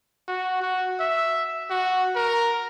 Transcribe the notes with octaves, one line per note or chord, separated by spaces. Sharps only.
F#4
F#4
E5
F#4
A#4